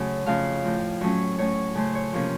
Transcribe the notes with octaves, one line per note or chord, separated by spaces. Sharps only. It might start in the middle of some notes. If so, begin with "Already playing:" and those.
Already playing: F#2 C#3 F#3 A3 C#4 F#5
F2 C#3 A3 F5
A2 F3 C4
A2 F#3 A3 C#4 C#5
A2 A3 C#4 C#5
C#3 A3 C#4 C5
C#5
C3 F3 A#3 C#4